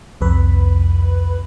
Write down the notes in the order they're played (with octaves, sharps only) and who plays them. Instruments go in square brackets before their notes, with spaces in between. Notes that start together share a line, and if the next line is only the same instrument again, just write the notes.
[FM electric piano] C2 F2 B4 B5